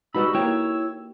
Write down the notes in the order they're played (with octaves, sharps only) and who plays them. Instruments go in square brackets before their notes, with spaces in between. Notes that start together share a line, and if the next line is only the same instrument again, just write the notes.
[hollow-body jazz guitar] G3 G#3 B5 [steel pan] D#4 F#4 B4 [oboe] E6
[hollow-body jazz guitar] A#3 G4 G5 [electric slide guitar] E4 C#5